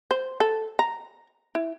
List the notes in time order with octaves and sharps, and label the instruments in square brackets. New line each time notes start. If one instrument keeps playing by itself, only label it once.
[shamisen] C5
A4
A#5
E4